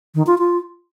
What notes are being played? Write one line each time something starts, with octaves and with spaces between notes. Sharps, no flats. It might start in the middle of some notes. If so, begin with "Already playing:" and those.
D#3
F4
F4